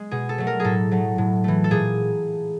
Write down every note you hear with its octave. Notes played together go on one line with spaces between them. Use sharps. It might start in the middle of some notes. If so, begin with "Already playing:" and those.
Already playing: G#3
B2 G#4
A4
F#3 A3
A#4
A2 G#4 A4
F#3 A3
A2
E3 A3
A4
A#2 G#4